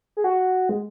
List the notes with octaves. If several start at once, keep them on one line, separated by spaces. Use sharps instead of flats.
G#4
F#4
G#3